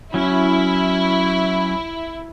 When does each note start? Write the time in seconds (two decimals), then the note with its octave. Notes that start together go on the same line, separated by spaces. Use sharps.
0.14 F#3 C#4 E4